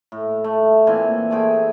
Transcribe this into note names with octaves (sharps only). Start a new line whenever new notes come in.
A2
A3
A#2 E3 C4 G#5
A3 C4 G#4 G5